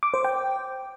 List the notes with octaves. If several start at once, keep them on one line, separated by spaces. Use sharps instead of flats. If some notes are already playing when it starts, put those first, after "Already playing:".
D6
C5
G5